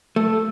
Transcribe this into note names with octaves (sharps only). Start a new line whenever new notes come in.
A3